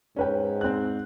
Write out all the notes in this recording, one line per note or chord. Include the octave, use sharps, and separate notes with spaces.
G#2 C#4 B4 G5
C4 F#6